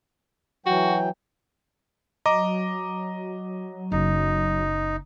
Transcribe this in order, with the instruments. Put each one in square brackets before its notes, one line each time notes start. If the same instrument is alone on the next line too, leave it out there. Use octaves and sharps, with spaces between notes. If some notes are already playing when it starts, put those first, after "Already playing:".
[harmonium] E3 F#3 G5 [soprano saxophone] F#4
[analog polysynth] F#3 [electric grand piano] D#5 A#5 D6
[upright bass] F#1 [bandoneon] D#4